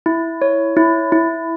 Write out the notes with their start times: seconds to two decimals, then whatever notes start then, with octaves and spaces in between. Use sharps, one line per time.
0.06 E4
0.42 C#5
0.77 E4
1.12 E4